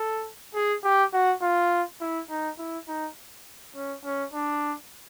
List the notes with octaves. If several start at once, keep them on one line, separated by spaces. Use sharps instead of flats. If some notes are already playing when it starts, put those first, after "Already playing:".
Already playing: A4
G#4
G4
F#4
F4
E4
D#4
E4
D#4
C#4
C#4
D4